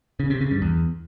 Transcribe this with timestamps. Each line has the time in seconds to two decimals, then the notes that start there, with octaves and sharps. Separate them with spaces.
0.20 C#3
0.30 C3
0.41 C#3
0.51 G2
0.62 E2